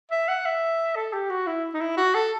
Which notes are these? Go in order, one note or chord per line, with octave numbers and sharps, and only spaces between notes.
E5
F#5
E5
A4
G4
F#4
E4
D#4
E4
F#4
A4